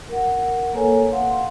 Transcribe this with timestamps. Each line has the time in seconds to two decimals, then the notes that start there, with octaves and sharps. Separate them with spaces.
0.09 A#4 F#5
0.73 A#3 A4 B4 C#5 G#5
1.12 F5 F#5 C6